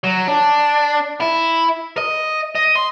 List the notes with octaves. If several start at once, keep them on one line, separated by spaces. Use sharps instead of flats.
F#3
D4
E4
D#5
D#5
C6